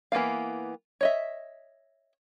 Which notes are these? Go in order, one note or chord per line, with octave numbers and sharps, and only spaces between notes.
E3 A#3 B3 F5
C#5 D#5 E5